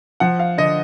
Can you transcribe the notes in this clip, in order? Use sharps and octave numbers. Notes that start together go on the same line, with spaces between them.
F3 F#5
F5
D3 D#5